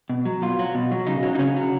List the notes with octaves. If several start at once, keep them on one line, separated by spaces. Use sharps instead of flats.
B2
F#3
B2 F4
F#3
B2
F#3
C#3 D#4
F#3
D#4
C#3 C#4
F#3